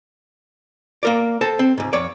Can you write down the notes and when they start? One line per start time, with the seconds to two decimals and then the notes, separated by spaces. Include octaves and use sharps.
1.03 A#3 A#4 D5
1.41 A4 C5 A5
1.59 C4
1.78 C#2 G#2
1.93 F2 C#5 D5